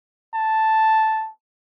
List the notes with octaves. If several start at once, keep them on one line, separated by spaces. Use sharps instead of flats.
A5